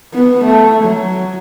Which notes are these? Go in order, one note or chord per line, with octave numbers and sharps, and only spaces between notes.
B3
A3
F#3